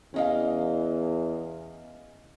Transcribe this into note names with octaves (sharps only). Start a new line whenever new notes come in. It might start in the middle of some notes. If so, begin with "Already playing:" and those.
E2 C#4 D#5 F5